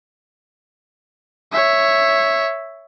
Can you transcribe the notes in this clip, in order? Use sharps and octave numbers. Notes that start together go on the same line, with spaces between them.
C#5 E5